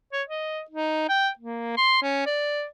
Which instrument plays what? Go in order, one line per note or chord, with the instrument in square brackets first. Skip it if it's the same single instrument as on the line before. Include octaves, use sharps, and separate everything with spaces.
[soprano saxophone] C#5
D#5
D#4
G5
A#3
C6
C#4
D5